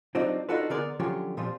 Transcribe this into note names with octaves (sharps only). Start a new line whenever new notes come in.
F#3 G3 C4 D4 D#4 F4
D4 D#4 F4 F#4 A4 B4
D3 B3 G#4 A#4 D5
D3 F3 F#3 C#4 F4 G4
A#2 F3 G3 C4 F4